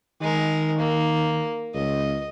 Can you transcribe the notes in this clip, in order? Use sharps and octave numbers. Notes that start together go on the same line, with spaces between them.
D#3 G#3 A#4
A#3
C#2 D#5